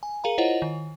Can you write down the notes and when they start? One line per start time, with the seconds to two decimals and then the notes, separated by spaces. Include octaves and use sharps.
0.03 G#5
0.24 G#4 A#4 F5 A#5
0.38 E4 F4 C5 C#5 D#5 F#5
0.62 D#3